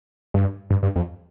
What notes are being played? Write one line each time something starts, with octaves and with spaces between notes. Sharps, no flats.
G2
G2
G2
F2